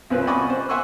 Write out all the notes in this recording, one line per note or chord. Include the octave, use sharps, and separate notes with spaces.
C2 C4 C#4 F4 B4
D5 D#5 F#5 G#5 B5 C#6
C5
E5 F#5 G#5 C6 C#6 E6